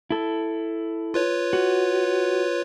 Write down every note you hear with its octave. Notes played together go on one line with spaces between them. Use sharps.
E4 A4
F4 B4 C#5
F#4